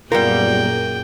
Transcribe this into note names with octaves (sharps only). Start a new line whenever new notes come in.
F#2 A#2 G3 B3 F4 G#4 A#4 G5